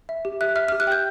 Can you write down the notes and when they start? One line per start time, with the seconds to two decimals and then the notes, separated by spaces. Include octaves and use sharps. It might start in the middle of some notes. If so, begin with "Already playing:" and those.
0.09 E5
0.25 G4
0.41 E5 F#6
0.56 E5 F6
0.68 F6
0.72 G4
0.80 F#6
0.87 G5 G6